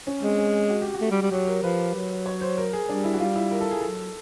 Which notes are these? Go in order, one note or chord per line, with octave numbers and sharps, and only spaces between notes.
C#4
G#3 C4
C#4
F#4
G4
F#4
A3
G3
G3
F#3 G4
A#4
F3 B4
F#3
C#5
C5
A#4
G#4
G3 D4
E4
F#4
G3 F4
E4
A#4
A4
G#4
F#3 A4